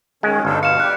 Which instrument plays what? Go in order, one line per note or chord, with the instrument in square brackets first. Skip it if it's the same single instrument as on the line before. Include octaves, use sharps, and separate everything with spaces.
[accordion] D#3 C#4 [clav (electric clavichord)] G#3
[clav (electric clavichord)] G1 [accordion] D4 D#4 A4
[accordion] B2 [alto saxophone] F5 [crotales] C#7 E7
[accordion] G3 G4 [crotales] F#6